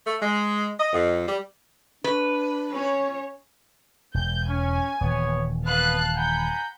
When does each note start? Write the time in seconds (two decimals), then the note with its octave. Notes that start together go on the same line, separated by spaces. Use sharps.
0.05 A3
0.21 G#3
0.78 D#5
0.93 F2
1.27 G3
2.04 D4 B4
2.72 C#4 C#5
4.14 E1 G6
4.49 C#4 G#5
5.01 D#1 E3 B3 C#5
5.65 B3 B4 F5 A5 F#6
6.17 F#5 G#5 A#5 B5 G6